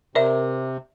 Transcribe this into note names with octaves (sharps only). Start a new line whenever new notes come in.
C3 A#4 C5 D5 E5